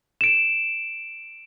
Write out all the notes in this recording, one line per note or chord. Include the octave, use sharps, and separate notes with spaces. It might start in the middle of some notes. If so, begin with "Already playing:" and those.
D7 E7